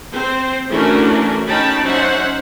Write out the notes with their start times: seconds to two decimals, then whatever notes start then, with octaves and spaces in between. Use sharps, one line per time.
0.12 C4 C5
0.70 E3 A3 C#4 D4 F#4 A#4
1.47 C#4 D#4 G5 A5 B5
1.82 F#3 C#4 D#4 C5 E5 F#5